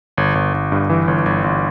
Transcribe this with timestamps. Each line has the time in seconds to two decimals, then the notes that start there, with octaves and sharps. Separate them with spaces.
0.17 G1
0.35 G1
0.54 G1
0.72 G2
0.90 E3
1.08 G1
1.26 G1
1.44 G1